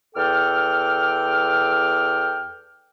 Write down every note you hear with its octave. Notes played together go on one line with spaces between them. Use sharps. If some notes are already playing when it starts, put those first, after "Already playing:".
E2 A4 G5 D6 F6